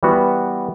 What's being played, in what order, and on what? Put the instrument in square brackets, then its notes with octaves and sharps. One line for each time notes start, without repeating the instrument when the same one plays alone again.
[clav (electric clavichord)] E3 G3 B3 F#4